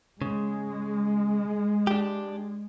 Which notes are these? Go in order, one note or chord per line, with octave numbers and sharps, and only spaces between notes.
C#3 G#3
D4 G4